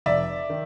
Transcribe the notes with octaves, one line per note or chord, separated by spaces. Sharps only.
F1 D5 E5
D#3